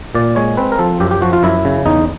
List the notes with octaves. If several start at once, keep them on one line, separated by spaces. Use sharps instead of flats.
A#2 D5
G#3 C#5
C4 B4
A#4
F3 A4
F#2 G4
G4
F3 F#4
F4
F#2 E4
C#3
E2 D#4